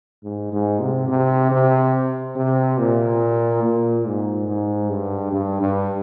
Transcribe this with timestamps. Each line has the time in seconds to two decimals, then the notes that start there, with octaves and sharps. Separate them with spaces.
0.24 G#2
0.52 G#2
0.80 C3
1.08 C3
1.51 C3
2.36 C3
2.78 A#2
3.63 A#2
4.05 G#2
4.48 G#2
4.90 G2
5.32 G2
5.61 G2